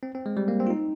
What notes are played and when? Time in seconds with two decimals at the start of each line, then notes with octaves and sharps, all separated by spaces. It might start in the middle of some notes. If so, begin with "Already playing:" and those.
0.03 C4
0.15 C4
0.26 G#3
0.37 G3
0.48 A#3
0.60 C4
0.67 F4
0.70 D#4